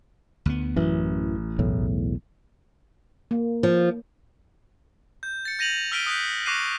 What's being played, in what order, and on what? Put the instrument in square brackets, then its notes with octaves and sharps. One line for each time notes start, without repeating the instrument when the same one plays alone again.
[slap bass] D2 B3
[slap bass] A1 [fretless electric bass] F#2 E3
[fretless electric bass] B1 E2 A2
[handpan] A#3
[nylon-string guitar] F3
[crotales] G6
A6 C#7
G6 A#6 D#7 F7 F#7
E6 F6 B6 D7 D#7 G7
D#6 F#6 G6 B6
C#6 D6 F#6 A#6 C7 D#7